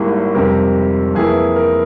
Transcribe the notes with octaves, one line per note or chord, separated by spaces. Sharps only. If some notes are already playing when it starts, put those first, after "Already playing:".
Already playing: G#1 G#2 G3 A#3 E4
F2 C3 G3 A#4
F2 E3 A#3 E4 G#4
A#4